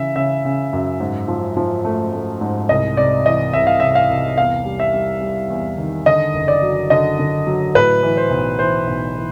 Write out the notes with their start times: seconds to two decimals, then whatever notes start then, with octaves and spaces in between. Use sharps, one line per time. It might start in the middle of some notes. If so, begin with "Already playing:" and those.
Already playing: C#3 E3 E5
0.16 C#3 E5
0.45 C#3
0.73 F#2
1.00 G#2
1.28 F3
1.57 F3
1.85 A3
2.13 A3
2.41 G#2
2.69 C2 D#5
2.97 C3 D5
3.25 E3 D#5
3.53 C2 E5
3.67 F5
3.80 C2 E5
3.95 F5
4.09 C2
4.38 E2 F5
4.65 G3
4.80 E5
4.94 G3
5.21 G3
5.50 E2
5.78 D#3
6.06 D3 D#5
6.34 F#1
6.48 D5
6.62 F#3
6.90 D3 D#5
7.19 D3
7.47 F#3
7.75 A2 B4
8.03 E3
8.17 C5
8.30 B1
8.59 E3 C5
8.87 B1
9.16 E3